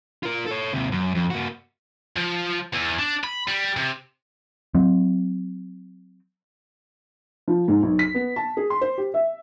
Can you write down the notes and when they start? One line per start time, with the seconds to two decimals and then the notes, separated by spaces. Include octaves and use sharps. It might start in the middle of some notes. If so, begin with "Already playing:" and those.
0.23 F4 A#4
0.46 A4 C#5
0.73 D#2 C3
0.92 F#2
1.15 F2
1.30 A#3 F#4
2.17 F3
2.74 E2
2.99 D4
3.24 B5
3.48 G3
3.77 C3
4.75 F#3 C4
7.48 F3
7.68 G#2
7.83 B1
7.99 B6
8.15 B3
8.36 A5
8.57 G#4
8.70 C6
8.81 C5
8.98 G4
9.14 E5